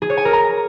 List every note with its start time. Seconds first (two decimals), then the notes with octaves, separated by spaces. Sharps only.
0.02 G#4
0.10 C#5
0.17 G#5
0.25 A#4
0.33 A#5